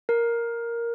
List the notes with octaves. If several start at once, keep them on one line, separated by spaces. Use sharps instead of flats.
A#4